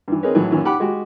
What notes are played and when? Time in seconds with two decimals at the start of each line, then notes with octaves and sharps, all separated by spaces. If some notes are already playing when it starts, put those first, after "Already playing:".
0.08 G2 E3
0.23 C4 D#4 G#4 A#4 B4 C#5
0.35 A2 E3 F#3
0.51 F#2 A#2 E3 C#4
0.65 G4 F#5 B5 D6
0.80 G#3 F#4 G4